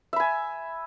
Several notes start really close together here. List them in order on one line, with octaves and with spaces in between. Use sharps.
E5 B5 G#5